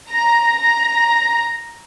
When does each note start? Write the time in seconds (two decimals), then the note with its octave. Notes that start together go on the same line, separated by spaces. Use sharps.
0.10 A#5
0.61 A#5